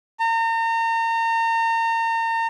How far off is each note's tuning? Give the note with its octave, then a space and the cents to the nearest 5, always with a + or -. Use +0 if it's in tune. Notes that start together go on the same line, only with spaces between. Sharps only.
A#5 -35